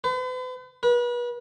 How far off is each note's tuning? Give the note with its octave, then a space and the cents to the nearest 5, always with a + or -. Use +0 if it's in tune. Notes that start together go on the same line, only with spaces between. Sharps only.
B4 +45
B4 -35